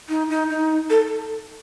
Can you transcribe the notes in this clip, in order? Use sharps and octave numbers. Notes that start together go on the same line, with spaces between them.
D#4
D#4
D#4
A4